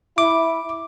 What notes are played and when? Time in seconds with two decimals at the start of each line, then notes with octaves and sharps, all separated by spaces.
0.18 E4 D6